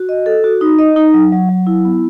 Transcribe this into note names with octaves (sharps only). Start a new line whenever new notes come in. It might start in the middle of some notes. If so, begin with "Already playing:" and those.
Already playing: F#4
D#5
A4
F#4
D#4
D#5
D#4
F#3
F#3
F#3
E4
B3